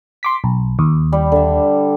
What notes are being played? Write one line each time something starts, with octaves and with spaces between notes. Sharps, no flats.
C6 D6 B6
B1
D#2
G3
D3 E5